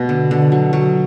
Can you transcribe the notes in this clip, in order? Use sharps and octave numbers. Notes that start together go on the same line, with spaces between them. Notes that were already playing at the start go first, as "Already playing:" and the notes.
Already playing: B2 A3
D3
D3
F#3
F#3